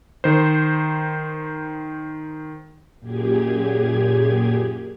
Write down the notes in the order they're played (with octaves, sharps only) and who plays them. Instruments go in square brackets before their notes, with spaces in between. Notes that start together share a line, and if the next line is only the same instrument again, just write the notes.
[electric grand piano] D#3 C5
[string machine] F#2 A#2 G4 G#4 G#6